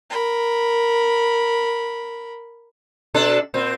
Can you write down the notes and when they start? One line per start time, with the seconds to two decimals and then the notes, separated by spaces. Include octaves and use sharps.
0.10 A#4 B5
3.14 B2 D4 A4
3.54 A#2 C4